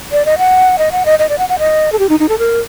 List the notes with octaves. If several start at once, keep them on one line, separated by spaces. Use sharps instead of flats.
D5
D#5
F#5
D#5
F#5
D#5
D#5
D5
F#5
F#5
D#5
A4
G4
D#4
D#4
A4
A#4